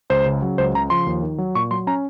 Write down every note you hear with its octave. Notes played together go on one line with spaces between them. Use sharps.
C#2 C5
C#3
F#3
C#2 C5
C#3 A#5
F3 C6
D#2
D#3
F#3
A#2 C#6
F#3 C6
C#4 A#5